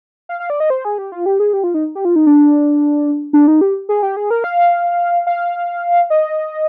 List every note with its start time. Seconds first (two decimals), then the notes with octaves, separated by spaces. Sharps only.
0.29 F5
0.40 F5
0.50 D5
0.60 D#5
0.70 C5
0.85 G#4
0.98 G4
1.12 F4
1.26 G4
1.40 G#4
1.53 G4
1.64 F4
1.74 D#4
1.95 G4
2.05 F4
2.16 D#4
2.27 D4
3.33 D4
3.47 D#4
3.61 G4
3.89 G#4
4.03 G4
4.16 G#4
4.30 A#4
4.44 F5
5.27 F5
6.10 D#5